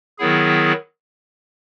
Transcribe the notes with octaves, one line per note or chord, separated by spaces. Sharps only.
D#3 F#3 B3 E4 G#4